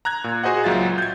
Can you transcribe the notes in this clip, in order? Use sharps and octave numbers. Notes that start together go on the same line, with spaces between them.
A#5 F#6 G#6
A#2
F#4 G#4 C5 D#5 F#5
C#2 A#2 F#3 F4 E5 A6
G6 G#6